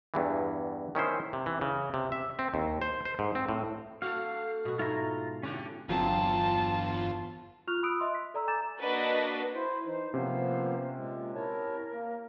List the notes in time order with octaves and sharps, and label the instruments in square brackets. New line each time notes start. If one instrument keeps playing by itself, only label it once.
[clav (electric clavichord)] E2 G2 E3
D#3 C#4 E4 C5
C3
E3
C#3
C3
E5
C4
D#2
C5
C5
G#2
C4
A2
[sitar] A3 A4 [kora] F#4 [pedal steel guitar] F5
[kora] B2 F#4
[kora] G#2 E4 C#5 [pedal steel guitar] F4 A#5
[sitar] D3 E4 G4 [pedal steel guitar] C#4 F#4
[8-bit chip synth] G1 F4 [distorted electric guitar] E2 [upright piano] F#3 C4 [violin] A5
[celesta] F4 C#6 F6 F#6 F7
B5 D#6 E6 F#6 D7
D#5 E5 C6
B6
A4 D5 A#5 E6
G#5 A#5 D6 G6 A6 E7
[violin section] A#3 D4 F#4 B4 D#5
[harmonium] E4 C5
[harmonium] E3 D#4 [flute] C5
[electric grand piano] C3 C#4 [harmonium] F3 A#3 B3 [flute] C5
[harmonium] A#2 G#3
[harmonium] E4 C#5 A5 [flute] A#4
[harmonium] A#3